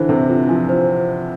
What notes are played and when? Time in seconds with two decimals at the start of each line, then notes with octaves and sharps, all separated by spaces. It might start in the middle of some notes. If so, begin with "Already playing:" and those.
Already playing: D3 E3 C5
0.09 C3 A4
0.29 D3 F4
0.49 F3 G#5
0.69 C5